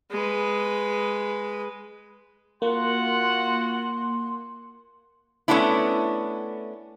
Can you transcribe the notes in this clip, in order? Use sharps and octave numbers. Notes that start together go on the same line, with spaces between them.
G#3 B4
A#3 F4 F#4 F#5 C6
A3 B3 C#4 D4 E4